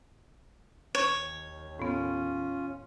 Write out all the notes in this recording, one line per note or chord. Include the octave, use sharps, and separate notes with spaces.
D#2 C#5
A2 B3 C#4 F4